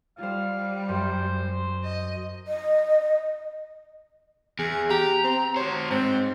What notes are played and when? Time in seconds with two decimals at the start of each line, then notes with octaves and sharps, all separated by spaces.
0.18 G3 F4 C5 F5
0.89 F#2 C5
1.84 D#5
2.48 D#5
4.59 E2 G#4
4.90 G4 A#5
5.24 C4
5.56 F#4 C5 C#5
5.91 G#2 C4